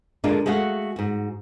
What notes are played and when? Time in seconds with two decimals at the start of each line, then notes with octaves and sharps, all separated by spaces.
0.24 A#2 D3 G#3 A#3 D4 F4
0.46 G#3 A3 F#4 F5 F#5
0.96 G#2 F#4